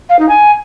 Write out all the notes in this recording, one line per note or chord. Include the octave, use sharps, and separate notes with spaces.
F5
D#4
G#5